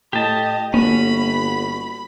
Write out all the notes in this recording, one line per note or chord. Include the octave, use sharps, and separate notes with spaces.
A2 G4 D#5 A5
G1 A#3 C#4 F#4 B5